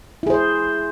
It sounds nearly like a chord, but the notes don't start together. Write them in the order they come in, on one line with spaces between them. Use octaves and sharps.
E4 G#4 C5